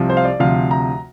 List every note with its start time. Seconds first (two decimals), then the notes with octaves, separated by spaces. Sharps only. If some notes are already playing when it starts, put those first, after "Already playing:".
Already playing: C2 C3 F3
0.10 C5
0.17 F5
0.25 D5
0.40 D2 C3 F3 F5
0.71 A#5